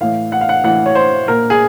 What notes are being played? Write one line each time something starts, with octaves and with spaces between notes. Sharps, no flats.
A2 E3 F5
F#5
F5
F#5
A2 E3 F#5
C#5
C5
A#2 A#4
G#4